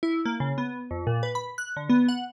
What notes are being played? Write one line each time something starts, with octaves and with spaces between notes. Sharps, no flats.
E4
A#3
C#3
B3
F2
A#2
B4
B5
F#6
D3
B3
F#5